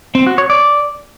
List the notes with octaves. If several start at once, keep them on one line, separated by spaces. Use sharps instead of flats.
C4
F#4
C#5
D5